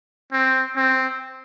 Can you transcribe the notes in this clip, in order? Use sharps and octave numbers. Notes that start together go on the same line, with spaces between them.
C4
C4